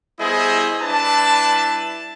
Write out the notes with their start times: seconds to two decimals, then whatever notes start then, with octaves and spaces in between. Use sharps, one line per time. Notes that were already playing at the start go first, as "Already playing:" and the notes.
0.20 G3 B3 E4 G#4 C5 D#5
0.82 G3 D4 E4 B4 A5